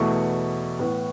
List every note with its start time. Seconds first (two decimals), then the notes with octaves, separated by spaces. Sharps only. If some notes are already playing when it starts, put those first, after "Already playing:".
Already playing: E2 B2 A3 C#6
0.79 A2 E3 B3